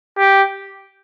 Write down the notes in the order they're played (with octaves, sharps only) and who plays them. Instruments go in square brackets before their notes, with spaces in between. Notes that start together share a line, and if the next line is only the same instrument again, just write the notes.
[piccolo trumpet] G4